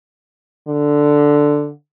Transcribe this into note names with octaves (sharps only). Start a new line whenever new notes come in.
D3